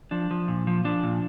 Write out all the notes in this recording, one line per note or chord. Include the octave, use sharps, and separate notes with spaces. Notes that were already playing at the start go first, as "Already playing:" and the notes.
F3 D4
F3
A#2
F3
F3 D4
A#2